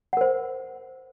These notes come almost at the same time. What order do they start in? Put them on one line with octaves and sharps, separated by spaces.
F#5 A#4 C5